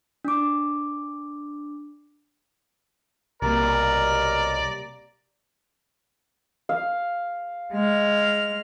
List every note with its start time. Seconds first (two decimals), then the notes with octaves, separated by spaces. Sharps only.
0.25 D4 D6
3.42 B1 C3 G3 A#3 A#4 D5 A#5
6.69 F5
7.74 G#3 F6